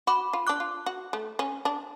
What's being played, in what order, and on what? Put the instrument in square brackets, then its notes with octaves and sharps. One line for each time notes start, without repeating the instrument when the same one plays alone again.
[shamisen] F#4 [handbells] B5 D6
[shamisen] F4
[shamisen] D4 [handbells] D6 F#6
[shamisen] F4
F#4
A3
C#4
D4